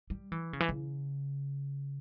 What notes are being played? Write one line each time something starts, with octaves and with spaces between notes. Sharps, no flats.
G3
E3
C#3
E3
C#3